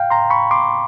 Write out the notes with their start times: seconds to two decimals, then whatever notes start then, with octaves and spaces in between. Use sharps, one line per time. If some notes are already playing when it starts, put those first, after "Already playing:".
Already playing: F5 G5
0.10 A#5 C6
0.30 B5 C#6
0.51 C6 D6